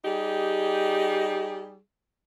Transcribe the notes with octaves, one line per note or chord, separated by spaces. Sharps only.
G3 D#4 G4 G#4